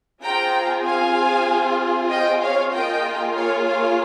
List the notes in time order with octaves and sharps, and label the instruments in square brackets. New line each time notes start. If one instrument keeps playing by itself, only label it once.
[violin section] C4 F4 G#4 G5 A#5
F5 G#5
D#5 G5
C#5 F5
A#3 F4 G#4 D#5 G5
C#5 F5
C#5 F5